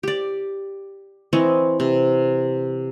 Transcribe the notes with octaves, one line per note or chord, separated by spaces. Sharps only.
G4 D5
E3 C4 C#5 D#5
C3